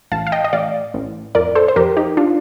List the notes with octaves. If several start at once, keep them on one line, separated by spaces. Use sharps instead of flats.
A1 F5 A5
F5
D#5 G5
D#5
A1 D5 F5
A1
F2 A#4 D5
A4 C5
C5
F2 G4 A#4
D#4 G4
D4 F4